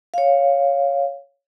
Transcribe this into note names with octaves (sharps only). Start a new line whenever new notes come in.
C#5 F5